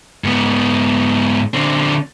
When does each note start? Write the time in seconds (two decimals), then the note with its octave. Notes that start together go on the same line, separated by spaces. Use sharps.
0.24 G#2 B3
1.54 D3 C4